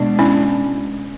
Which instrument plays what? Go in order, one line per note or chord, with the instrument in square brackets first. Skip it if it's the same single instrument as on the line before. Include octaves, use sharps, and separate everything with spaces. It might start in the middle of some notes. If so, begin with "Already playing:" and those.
Already playing: [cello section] B2 G#3 D4
[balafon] C#4 E4